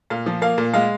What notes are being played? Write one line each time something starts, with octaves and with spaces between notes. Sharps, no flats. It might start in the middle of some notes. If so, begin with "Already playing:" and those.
A#2 F5
F3
A#3 F5
A#2
G#3 F5